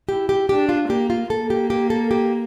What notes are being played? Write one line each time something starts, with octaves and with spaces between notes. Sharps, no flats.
E4 G4
G4
D4 G4
F4
A#3 G4
F4
A#3 A4
G4
G4
A4
G4